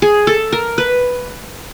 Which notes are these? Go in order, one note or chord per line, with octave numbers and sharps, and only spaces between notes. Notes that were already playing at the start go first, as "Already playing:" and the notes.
G#4
A4
A#4
B4